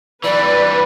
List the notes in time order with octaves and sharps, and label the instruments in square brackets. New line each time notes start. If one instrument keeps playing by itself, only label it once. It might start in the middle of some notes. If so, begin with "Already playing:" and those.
[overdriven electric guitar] E3 G3 [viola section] B4 [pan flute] D5